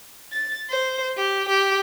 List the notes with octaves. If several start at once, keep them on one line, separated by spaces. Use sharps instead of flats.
A6
C5
G4
G4